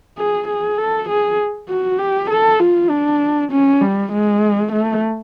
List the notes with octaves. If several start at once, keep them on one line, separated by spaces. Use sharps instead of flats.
G#4
G#4
A4
G#4
F#4
G4
A4
F4
D4
C#4
G3
G#3
A3